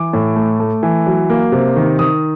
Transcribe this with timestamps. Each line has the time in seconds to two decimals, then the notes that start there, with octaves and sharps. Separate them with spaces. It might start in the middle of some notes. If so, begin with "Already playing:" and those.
Already playing: E3 D6
0.13 A2
0.36 A3
0.60 A3
0.83 E3
1.07 F#3
1.30 A#3
1.52 C3
1.76 D#3
1.99 D#3 D#6